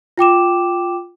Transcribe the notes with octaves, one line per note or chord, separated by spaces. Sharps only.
F4 G5 D6 E7